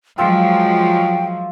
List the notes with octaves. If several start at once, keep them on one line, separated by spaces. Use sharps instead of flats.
F3 F#3 G#3 F4 E5 G5